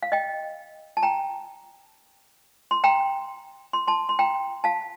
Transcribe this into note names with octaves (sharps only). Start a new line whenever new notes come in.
F5
D#5 G5
A5
G5 A#5
C6
G5 A#5
C6
A5 C6
C6
G5 A#5
F5 A5